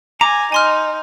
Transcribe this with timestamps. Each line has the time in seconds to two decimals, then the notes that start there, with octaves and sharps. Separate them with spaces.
0.21 G#5 A#5 D6
0.52 D#4 G#5 C6 F6